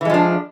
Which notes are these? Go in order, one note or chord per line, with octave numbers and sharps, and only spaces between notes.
E3 F3 G#3 D4